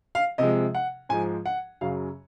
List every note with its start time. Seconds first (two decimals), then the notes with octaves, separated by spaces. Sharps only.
0.15 F5
0.38 C3 F3 G#3 D#5
0.75 F#5
1.09 G#2 F3 G#3 G#5
1.46 F#5
1.81 F#2 C#3 F#3 F5